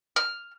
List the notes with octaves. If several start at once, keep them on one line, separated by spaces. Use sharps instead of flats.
F6